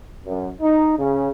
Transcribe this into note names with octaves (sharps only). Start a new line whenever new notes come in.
F#2
D#4
C#3